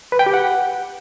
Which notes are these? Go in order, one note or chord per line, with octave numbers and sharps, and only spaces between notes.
B4
G5
G4
F#5